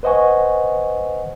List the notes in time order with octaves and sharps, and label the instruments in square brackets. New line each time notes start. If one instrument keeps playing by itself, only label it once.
[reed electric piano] B4 C5 D#5 F#5 G#5 C#6